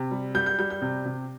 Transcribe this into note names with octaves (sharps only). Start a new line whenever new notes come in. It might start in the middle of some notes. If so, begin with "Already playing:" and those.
Already playing: C3
G3
G3 G6
G6
G3 G6
G6
C3
C3